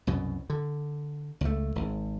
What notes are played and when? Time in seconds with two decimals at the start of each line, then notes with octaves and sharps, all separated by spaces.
0.07 C2 F#2 B2
0.50 D3
1.41 C#2 A3
1.75 G#1